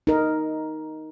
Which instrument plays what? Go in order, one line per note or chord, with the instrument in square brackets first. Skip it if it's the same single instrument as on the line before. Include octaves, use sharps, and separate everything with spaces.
[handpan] D#4 A#4